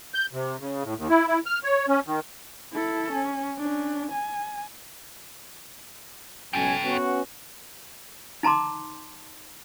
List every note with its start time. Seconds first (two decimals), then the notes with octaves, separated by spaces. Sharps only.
0.14 G6
0.33 C3
0.60 C#3
0.84 A2
0.97 D#2
1.09 E4
1.27 E4
1.46 F6
1.63 C#5
1.88 C#4
2.06 D#3
2.73 E4 A4
3.12 C#4
3.57 C#4 D4
4.12 G#5
6.53 B1 C#4 A4 G5 G#5
6.84 B3 C#4 F#4
8.43 D#4 A5 A#5 C6 D6